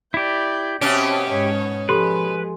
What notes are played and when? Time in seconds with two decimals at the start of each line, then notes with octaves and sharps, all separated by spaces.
0.14 E4 G4 D5 G6
0.81 B2 C4 C#4 G4 C#5 E5
1.30 G#2 C#5
1.89 F3 G#3 G4 A4 B4 C6